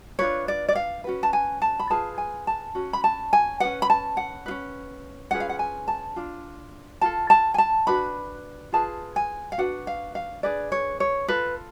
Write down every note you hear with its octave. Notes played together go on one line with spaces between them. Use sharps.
D4 F4 B4 C#5
D5
D5
F5
C#4 F#4 B4
A5
G#5
A5
B5
F4 G#4 B4 A5
G#5
A5
C#4 F#4
B5
A5
G#5
C#4 G#4 B4 F#5
B5
A5
F#5
F4 B4
C#4
C#4 F4 G#4 B4 F#5
F5
F#5
G#5
A5
D4 F4
F4 A4 A5
A5
G#5
A5
D4 F#4 B4 B5
F4 G#4 B4 A5
G#5
F5
D4 F#4 B4 F#5
F5
F5
D4 G#4 B4 D5
C#5
C#5
F4 A4 B4